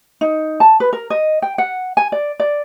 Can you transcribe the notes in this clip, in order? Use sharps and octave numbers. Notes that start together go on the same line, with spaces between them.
D#4
A5
B4
A#4
D#5
G5
F#5
G#5
D5
D5